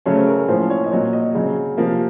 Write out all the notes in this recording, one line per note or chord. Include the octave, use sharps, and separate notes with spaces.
C#3 F#3 A3 C#4 C#5
C5
A#4
A#4
A2 F3 A#3 C#4 C5
C#5
D#5
A#2 F#3 C4 C#5
D#5
C#3 F#3 C4 C#5
C3 F3 A#3